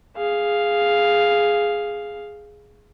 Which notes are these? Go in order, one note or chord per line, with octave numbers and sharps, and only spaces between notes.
G#4 F5